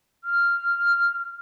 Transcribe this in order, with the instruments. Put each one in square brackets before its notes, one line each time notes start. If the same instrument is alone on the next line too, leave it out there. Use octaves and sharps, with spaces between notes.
[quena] F6